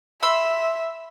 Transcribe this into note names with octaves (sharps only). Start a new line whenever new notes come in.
E5 B5 C6 E6